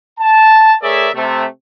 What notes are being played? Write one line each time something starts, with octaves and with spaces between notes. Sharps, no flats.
A5
A3 G#4 A#4 C#5 D5 E5
C3 A3